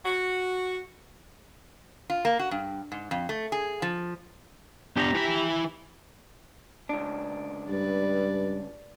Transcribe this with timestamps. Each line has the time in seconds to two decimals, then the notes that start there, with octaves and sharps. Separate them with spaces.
0.05 F#4
2.10 F4
2.25 A#3
2.39 F#4
2.51 G2
2.92 G#2
3.11 F2
3.29 A3
3.52 G#4
3.82 F3
4.97 B3 D4 G4 A#5
5.14 E3 B5
6.89 C#2 D4
7.69 G2 B4 D5